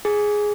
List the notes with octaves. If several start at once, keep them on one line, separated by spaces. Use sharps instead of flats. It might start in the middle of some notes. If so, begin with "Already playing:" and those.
G#4